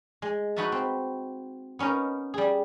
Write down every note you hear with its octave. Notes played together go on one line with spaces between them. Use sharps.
G#3
D#4 E4 F#4 B4 E5 A5
C4
B3 C#4 D#4 A#4
G3 G#4